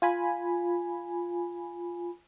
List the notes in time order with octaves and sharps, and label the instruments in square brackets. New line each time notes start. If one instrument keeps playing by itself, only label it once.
[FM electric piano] F4 G#5 B5